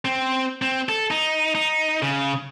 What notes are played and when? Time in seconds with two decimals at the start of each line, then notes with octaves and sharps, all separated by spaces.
0.05 C4
0.62 C4
0.89 A4
1.11 D#4
1.55 D#4
2.02 C#3